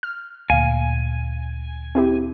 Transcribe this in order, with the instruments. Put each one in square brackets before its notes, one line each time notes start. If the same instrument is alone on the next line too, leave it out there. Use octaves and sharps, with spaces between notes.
[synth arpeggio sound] F6
[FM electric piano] D2 A#2 [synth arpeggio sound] F5 [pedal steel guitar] G#5
[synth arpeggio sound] C4 E4 G4